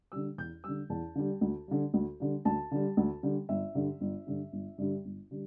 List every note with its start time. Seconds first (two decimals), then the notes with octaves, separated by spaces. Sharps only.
0.12 D3 G3 E6
0.38 E2 G6
0.64 D3 G3 E6
0.90 E2 A5
1.15 D3 G3
1.41 D2
1.68 D3 G3
1.94 D2
2.20 D3 G3
2.45 D2 A5
2.71 D3 G3
2.97 D2
3.23 D3 G3
3.49 G1 E5
3.75 G2 D3 G3
4.01 G1
4.26 G2 D3 G3
4.52 G1
4.78 G2 D3 G3
5.05 G1
5.31 D3 G3